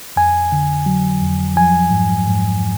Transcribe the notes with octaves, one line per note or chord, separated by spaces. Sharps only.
F2 G#5
D3
F#3
F2
F3 G#5
G#2
G#2